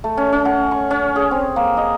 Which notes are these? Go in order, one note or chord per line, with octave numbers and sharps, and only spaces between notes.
A3
C#4
C#4
F#5
C#6
C#4
G#4
C4
A#3
D#5